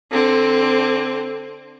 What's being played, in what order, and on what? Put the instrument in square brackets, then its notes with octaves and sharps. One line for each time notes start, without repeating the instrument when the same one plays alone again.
[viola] D3 C4